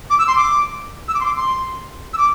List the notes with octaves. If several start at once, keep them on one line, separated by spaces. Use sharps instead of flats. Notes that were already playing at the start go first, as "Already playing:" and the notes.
D6
E6
C6
D6
E6
D6
C6
D6
C6
E6
D6